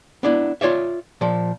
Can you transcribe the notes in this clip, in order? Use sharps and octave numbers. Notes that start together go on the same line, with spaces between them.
B3 D4 E4
F4 C#5 D5 E5
A#2 F3